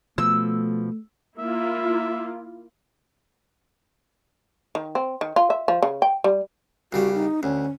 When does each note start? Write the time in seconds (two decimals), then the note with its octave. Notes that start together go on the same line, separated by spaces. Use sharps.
0.18 B2 F3 A3 E6
1.38 A#3 E4 F4 E5
4.75 D#3
4.95 C4
5.21 D#3
5.36 F4
5.50 E5
5.68 F3
5.83 C#3
6.02 G5
6.24 G3
6.93 C2 C#3 G3 F#4
7.15 D#4
7.43 D2 C#4